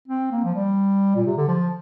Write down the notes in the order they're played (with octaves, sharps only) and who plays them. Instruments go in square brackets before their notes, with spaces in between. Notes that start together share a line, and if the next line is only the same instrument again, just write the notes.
[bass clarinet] C4
A#3
F3
G3
A#2
C3
D3
F3